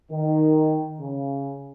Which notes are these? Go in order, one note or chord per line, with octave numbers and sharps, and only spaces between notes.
D#3
C#3